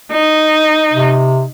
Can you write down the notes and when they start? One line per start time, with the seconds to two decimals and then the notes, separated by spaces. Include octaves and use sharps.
0.12 D#4
0.93 C3